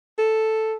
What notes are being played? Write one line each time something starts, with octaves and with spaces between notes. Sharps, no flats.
A4